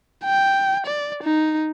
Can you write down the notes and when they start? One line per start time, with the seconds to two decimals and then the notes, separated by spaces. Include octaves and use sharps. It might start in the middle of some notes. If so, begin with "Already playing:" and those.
0.25 G5
0.86 D5
1.23 D#4